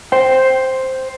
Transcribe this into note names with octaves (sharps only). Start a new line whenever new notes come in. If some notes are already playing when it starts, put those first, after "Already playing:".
C5 G5